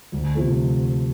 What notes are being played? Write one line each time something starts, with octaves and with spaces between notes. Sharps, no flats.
D2
C3 F3 A3